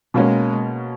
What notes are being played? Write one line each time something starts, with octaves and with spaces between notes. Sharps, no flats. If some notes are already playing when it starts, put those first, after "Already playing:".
B2 G#3 A#3 C#4